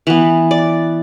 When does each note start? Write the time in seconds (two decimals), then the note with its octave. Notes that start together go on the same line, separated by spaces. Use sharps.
0.07 E3 B3 B4
0.51 D5